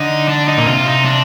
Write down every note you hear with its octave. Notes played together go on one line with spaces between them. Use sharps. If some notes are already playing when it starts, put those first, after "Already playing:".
Already playing: D3 D#4
D4
D#4
A#2
C3 F4
D#4
D4